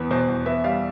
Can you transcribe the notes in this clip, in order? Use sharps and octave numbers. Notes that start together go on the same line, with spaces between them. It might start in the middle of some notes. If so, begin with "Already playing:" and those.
Already playing: E2 B3
B2 C5
E2
B3 E5
G3 F5